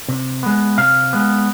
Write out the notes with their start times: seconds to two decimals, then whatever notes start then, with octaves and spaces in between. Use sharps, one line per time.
0.08 C3
0.43 G#3 B3
0.78 C3 F5
1.13 G#3 B3